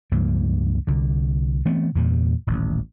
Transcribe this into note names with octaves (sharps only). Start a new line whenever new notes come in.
C#2 G2 F3 A#3
C2 D3
E3 A3 B3 C4
E2 G2 A#2
D#1 A1